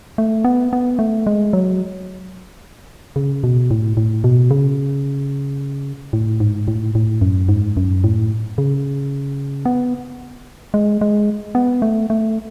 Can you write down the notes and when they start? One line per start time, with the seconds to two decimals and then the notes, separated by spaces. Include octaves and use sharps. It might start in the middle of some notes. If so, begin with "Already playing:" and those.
0.18 A3
0.45 B3
0.73 B3
0.99 A3
1.27 G#3
1.53 F#3
3.16 C#3
3.44 B2
3.71 A2
3.97 A2
4.24 B2
4.51 C#3
6.13 A2
6.40 G#2
6.68 A2
6.95 A2
7.21 F#2
7.49 G#2
7.77 F#2
8.04 A2
8.58 C#3
9.65 B3
10.74 G#3
11.01 G#3
11.55 B3
11.82 A3
12.10 A3